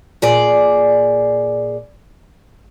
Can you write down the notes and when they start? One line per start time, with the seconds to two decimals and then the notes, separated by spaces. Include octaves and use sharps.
0.22 A#2 G#4 D5